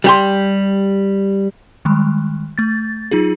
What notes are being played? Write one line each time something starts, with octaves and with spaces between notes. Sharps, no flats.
G3 G4 C6
D#3 G3 G#3
A3 A6
F#3 D#4 F4 G#4